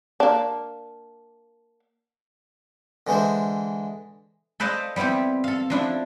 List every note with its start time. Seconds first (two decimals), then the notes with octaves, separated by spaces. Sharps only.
0.20 A#3 D4
3.07 D3 E3 G#3 C5
4.60 A4 B4 C5 D5 D#5 F5
4.96 G3 B3 C4 E4 G4
5.44 A4 F5
5.70 F3 D4 E4